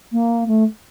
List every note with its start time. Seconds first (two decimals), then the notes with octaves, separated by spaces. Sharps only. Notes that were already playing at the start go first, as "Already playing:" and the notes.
0.12 A#3
0.48 A3